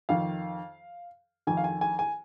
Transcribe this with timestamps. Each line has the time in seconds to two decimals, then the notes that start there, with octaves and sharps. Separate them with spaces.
0.09 F2 D#3 F5
1.47 F2 D#3 G#5
1.57 F5
1.64 G#5
1.81 G#5
1.99 G#5